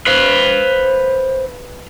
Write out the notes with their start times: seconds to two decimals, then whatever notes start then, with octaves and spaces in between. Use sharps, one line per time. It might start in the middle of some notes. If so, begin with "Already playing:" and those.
0.07 B4 C5 F5